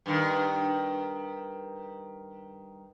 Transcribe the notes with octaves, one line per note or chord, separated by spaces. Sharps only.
G2 D#3